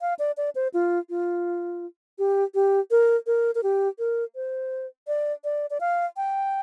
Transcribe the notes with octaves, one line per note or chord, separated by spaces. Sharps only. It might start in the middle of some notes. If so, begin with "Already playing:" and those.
F5
D5
D5
C5
F4
F4
G4
G4
A#4
A#4
A#4
G4
A#4
C5
D5
D5
D5
F5
G5